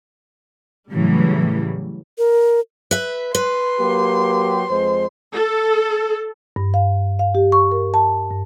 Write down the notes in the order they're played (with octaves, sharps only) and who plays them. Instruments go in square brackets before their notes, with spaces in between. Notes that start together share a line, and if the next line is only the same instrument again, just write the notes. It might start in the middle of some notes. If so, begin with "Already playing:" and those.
[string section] A2 C#3 E3 F#3 G3
[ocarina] A#4
[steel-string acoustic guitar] B4 E5
[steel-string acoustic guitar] B4 [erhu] C6
[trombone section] F#3 A#3 G4
F2 G#3 C5
[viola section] A4
[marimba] G2
F5
F5
G4
C#6
A#4
A5
G2